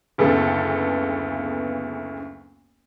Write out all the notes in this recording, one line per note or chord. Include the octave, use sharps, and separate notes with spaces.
F#1 D2 C#3 B3 A4